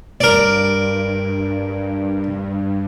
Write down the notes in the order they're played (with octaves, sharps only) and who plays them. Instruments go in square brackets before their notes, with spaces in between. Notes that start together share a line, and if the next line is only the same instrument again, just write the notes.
[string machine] G2 [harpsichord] A#4 D5